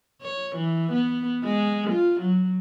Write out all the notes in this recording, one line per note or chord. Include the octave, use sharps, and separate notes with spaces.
C#5
E3
B3
G#3
F4
F#3